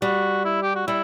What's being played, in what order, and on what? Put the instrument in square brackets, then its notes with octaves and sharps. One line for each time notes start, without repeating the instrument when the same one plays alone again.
[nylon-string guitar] G3 [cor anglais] F#4
[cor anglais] E4
G4
F#4
[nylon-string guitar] G3 [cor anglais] E4